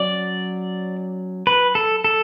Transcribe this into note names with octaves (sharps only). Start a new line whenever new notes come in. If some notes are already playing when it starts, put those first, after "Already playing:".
Already playing: F#3 C#4 D5
B4
A4
A4